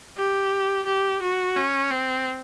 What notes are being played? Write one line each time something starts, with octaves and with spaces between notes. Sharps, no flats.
G4
G4
F#4
C#4
C4